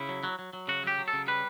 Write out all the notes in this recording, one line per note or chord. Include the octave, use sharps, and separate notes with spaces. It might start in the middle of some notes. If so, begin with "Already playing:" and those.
Already playing: C#3 E4
F#3
F#3
F#3
F#3
C#3 F#4
F#3 G4
F#3
A4
C#3
G3 B4